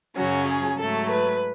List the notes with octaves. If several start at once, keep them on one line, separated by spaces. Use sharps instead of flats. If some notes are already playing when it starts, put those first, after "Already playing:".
F#2 C#3 F#3 C#4 F#4
G#4
G#2 F#3 A3 A4
B4